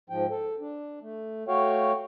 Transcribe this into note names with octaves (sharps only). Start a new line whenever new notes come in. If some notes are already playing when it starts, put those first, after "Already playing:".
G#2 F3 G5
A4
D4
A3
A3 F#4 C#5 F5 G5